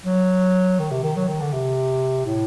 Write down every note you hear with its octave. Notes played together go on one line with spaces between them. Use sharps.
F#3
D#3
C3
D#3
F#3
D#3
D3
C3
A2